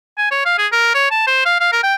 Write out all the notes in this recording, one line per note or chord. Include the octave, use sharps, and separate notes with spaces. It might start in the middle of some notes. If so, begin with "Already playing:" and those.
G#5
C#5
F5
G#4
A#4
C#5
A5
C5
F5
F5
A#4
G5